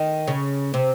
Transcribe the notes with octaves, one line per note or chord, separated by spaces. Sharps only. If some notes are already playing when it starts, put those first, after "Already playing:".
Already playing: D#3
C#3
C3